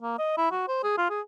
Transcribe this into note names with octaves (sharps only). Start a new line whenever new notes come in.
A#3
D#5
E4
F#4
C5
G#4
F4
G#4